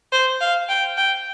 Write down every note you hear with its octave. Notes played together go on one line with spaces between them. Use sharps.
C5
F5
G5
G5